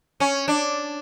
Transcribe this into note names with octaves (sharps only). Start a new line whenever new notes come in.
C#4
D4